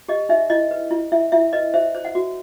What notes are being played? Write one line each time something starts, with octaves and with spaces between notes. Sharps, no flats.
G4 D#5
D#4 E5
E4 D#5
B4
E4
E4 E5
E4 E5
B4 D#5
C5 E5
C5
F#5
F#4